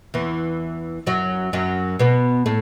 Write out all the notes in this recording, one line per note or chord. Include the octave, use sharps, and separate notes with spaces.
E2 E3
F#2 F#3
F#2 F#3
B2 B3
A2 A3